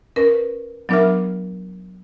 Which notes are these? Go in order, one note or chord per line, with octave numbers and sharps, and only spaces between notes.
C#4 A#4 B4
F#3 B3 D4 A#4 E5 F6